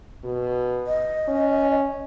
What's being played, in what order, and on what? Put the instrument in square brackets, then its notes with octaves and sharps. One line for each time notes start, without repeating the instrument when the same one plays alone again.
[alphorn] B2
[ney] D#5
[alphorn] C#4